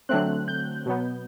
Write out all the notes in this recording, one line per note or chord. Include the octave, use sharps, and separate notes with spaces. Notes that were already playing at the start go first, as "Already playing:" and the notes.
D3 F#3 A3 C4 F#6
G6
B2 F#3 B3